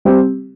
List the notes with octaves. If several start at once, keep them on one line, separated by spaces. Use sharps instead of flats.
G3 C4 G4